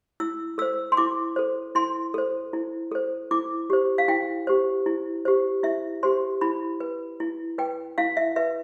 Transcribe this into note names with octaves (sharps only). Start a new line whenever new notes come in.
E4 E6
A4 C5 E6
C6
E4 D6
A4 C5
E4 C6
A4 C5
E4
A4 C5
E4 D6
G4 C5
F5
E4 G5
G4 C5
E4
G4 C5
E4 E5
G4 C5 C6
E4 B5
B4
E4
B4 G5
E4 F5
E5
B4 E5